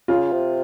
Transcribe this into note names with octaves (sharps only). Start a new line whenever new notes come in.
C#3 F4
C3